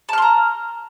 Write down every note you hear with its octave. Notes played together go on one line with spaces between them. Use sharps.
A5 A#5 C6 F6